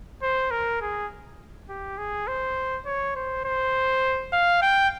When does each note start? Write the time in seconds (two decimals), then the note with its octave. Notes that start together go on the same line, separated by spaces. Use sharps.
0.22 C5
0.51 A#4
0.81 G#4
1.69 G4
1.98 G#4
2.27 C5
2.86 C#5
3.16 C5
3.45 C5
4.33 F5
4.62 G5